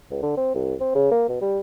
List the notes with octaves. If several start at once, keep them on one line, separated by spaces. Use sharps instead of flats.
C#2
D3
C4
C2
C4
C#3
A#3
B2
G3